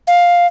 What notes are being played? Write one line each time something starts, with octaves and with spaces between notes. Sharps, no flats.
F5